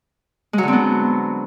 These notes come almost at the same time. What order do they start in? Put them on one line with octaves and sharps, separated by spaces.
G#3 F#3 D3 C4 B3